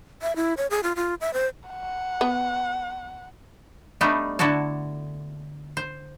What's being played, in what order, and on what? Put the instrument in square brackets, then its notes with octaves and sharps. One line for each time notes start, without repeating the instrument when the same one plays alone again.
[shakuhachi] E5
E4
C#5
G#4
F4
F4
E5
C5
[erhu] F#5
[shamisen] B3
[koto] G3 A3 B3 D4 D#4
D3 E4 F#4 A4 A5
C5